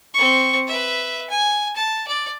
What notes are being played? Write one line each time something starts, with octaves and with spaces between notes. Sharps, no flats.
C4 C#6
B4 E5
G#5
A5
D5